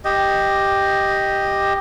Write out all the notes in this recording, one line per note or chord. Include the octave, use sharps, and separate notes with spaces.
G4 D#5